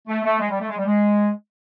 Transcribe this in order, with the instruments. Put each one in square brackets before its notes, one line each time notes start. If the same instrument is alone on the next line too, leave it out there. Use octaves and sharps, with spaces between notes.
[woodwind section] A3
A3
G#3
G3
A3
G#3
G3
G#3